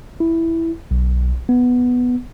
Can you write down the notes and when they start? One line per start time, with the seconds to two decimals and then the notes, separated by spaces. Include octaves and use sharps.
0.20 E4
0.91 B1
1.49 B3